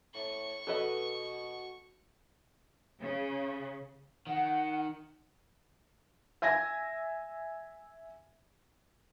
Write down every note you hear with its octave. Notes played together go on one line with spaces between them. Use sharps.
A2 C#6
B2 F#4 A4 B4 D#5
C#3
D#3 F#5
E5 G#5 G#6 A#6